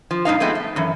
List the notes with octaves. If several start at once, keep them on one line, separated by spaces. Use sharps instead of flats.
F3
G2 A#2 D#4 F5
F3 G#3 A3 B3 C4
A3
F#2 E3